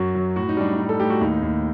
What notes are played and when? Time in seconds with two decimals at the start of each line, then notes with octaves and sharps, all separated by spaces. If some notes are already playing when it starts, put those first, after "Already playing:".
Already playing: F#2 F#4
0.15 F#3
0.36 A2 F#4
0.49 D#4
0.57 G3 D4
0.73 D#4
0.79 A2
0.89 A4
1.00 A2 G4
1.10 F#4
1.21 D#2 D#4
1.42 D#2